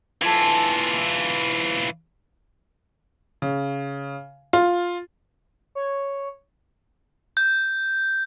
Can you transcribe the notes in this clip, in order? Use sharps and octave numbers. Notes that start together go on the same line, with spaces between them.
E3 F4 A4 G#5
C#3
F4
C#5
G6